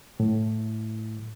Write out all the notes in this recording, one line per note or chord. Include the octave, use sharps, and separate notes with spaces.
A2